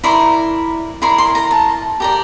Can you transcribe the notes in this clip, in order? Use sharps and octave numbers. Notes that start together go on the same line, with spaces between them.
E4 A#4 D5 C6
E4 A#4 D5 C6
C6
A#5
A5
G4 A#4 D5